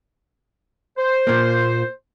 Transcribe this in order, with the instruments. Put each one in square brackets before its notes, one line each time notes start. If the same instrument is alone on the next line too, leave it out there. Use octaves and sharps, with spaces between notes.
[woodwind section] C5
[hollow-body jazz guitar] A#2 A#3